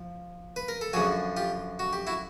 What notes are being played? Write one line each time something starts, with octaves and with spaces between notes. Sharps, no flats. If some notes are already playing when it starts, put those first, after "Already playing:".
Already playing: F3
B4
A#4
A4
F#2 D3 F3 F#4 G#4
F4 G4
F#4
G4
E4 F#4